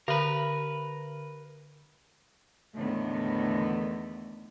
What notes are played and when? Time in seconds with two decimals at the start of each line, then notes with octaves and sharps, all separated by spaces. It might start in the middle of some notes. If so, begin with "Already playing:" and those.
0.08 D3 A#4 B4
2.74 E2 A2 D3 D#3 A3 B3